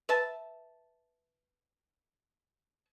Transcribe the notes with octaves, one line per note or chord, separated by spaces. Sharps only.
B4 E5 A5